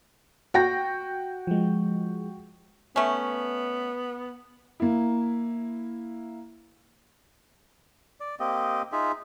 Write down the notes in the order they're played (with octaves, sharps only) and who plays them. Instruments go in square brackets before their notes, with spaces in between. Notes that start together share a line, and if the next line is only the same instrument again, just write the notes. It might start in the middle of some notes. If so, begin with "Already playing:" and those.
[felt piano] F#4 G5 A#6
[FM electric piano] F3 G#3
[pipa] A3 C#4 [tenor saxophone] B3
[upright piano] A#3 E4
[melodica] D5
A#3 C4 G4 D#5
D#4 F4 G#4 E5